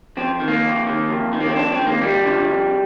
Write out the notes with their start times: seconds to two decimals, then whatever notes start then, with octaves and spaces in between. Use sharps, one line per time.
0.17 F2 C4
0.40 D#3
0.48 A#3
0.63 F2
0.86 D#3
1.09 F2
1.33 D#3
1.40 A#3
1.48 C4
1.55 F2 D4
1.71 C4
1.79 D#3
1.87 A#3
2.02 F2 G3
2.25 D3 F3
2.48 F2